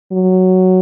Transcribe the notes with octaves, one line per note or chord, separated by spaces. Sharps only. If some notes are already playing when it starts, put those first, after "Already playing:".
F#3